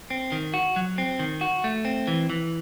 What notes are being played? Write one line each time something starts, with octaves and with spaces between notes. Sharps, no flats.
C4
D#3
F#4
F#3
C4
D#3
F#4
A3
C4
E3
E3